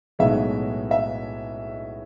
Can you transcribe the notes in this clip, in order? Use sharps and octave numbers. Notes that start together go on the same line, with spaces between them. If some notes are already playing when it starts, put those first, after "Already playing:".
B1 A2 E3 G#3 B3 E5
E5